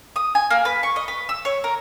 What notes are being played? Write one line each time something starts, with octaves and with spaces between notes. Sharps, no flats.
D#6
G#5
A#3
B4
C#6
D#5
B4
E6
C#5
A#4